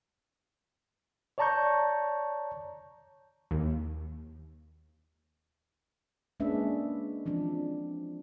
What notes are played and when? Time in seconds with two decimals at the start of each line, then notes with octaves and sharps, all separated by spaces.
1.38 C#5 D5 A5 A#5 C#6 G6
3.51 D#2
6.40 G#3 A#3 C#4 D4 B4 E5
7.26 E3 F3 C4 D4